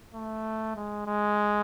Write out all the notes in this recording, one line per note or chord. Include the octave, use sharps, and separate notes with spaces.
A3
G#3
G#3